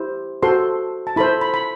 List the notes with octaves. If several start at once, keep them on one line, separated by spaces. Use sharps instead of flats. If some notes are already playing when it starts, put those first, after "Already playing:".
Already playing: E4 G4 C5
F#4 A4 C5 C6
A5
E4 A4 C5 B5
B5
B5